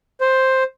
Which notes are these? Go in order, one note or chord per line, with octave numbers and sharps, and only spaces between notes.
C5